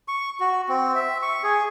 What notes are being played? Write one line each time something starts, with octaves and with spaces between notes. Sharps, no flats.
C#6
F#4
C4
E5
C#6
G#4